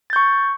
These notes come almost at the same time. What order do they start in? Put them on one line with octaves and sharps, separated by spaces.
A6 G6 C#6